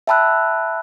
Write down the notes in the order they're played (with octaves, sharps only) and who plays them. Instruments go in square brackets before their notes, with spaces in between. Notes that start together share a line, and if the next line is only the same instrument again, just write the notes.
[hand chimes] E5 G5 A5 B5 E6 F#6